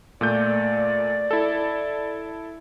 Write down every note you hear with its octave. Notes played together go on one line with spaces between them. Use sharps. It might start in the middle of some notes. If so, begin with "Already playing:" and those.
A#2 A3 D5 G6
E4 A4